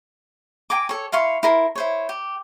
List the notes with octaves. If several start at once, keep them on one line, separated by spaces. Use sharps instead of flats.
G5 G#5 A#5 D6
A4 C#5
E4 F5 C6 C#6
E4 A#4 C6
E4 C5 C#5
G4